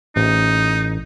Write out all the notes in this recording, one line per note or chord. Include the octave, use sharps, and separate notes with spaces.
A1 D#4